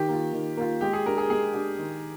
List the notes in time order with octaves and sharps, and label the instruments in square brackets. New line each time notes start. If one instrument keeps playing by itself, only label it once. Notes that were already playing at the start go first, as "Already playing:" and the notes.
Already playing: [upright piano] D#3 [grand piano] G4
[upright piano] A#3 F4
D#3
A#3 F4
[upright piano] G#3 [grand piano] G4
[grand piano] G#4
[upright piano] D4 G4 [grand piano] A#4
[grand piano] G#4
[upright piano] G#3 [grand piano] G#4
[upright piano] D4 G4
D#3